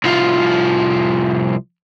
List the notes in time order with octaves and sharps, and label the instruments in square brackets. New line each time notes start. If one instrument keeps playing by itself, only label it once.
[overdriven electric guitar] C2 F3